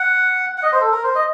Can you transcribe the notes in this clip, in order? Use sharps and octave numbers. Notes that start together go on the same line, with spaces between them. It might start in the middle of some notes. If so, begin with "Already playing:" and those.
Already playing: F#5
F#5
D#5
C5
A4
A#4
C5
D#5